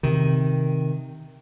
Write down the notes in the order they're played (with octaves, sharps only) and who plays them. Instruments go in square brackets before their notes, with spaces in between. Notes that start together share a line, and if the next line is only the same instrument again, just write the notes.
[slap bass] C3 D#3